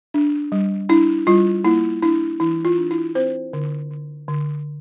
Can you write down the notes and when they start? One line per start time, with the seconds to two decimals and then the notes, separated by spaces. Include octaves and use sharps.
0.14 D4
0.52 G3
0.89 D4 E4
1.27 G3 F4
1.65 A#3 E4
2.03 D4 E4
2.40 E3 E4
2.65 F4
2.78 D4
2.91 E4
3.15 C4 C5
3.53 D3
3.90 D3
4.28 D3